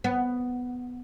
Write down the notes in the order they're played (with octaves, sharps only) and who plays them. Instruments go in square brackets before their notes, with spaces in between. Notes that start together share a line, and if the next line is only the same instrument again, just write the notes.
[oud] B3